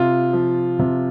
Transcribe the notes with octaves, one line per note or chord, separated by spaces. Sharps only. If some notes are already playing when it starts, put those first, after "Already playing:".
Already playing: C3 F4
F3
C3